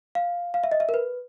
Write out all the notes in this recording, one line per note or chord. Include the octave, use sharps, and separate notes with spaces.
F5
F5
E5
D#5
E5
A#4
B4